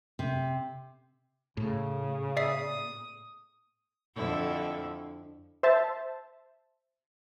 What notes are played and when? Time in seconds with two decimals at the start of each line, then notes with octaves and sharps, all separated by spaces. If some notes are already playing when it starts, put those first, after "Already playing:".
0.19 C3
1.57 A2 C#3
2.37 D5 E5 D#6 C7
4.16 F2 D3 E4
5.63 C5 E5 A5